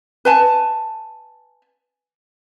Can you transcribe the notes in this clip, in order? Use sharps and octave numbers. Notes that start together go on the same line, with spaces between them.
B4 G#5 A5